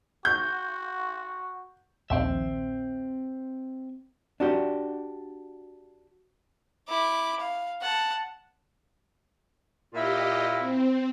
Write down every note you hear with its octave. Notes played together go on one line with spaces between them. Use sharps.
F#4 G6
A#1 D#2 C4 E5
D4 F#4 G4
E4 D6
F5
F#5 A5
A#2 E4 F4 G4 D#5
C4